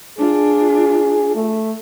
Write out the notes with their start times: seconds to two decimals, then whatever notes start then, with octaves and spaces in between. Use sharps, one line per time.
0.18 D4 F4 G#4
1.35 A3